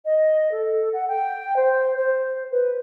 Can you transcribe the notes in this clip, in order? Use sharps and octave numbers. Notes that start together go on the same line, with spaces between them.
D#5
A4
F#5
G5
C5
C5
B4